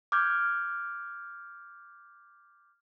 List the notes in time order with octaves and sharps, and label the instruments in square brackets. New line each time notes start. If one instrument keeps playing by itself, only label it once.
[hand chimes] D6 F6 G6 G#6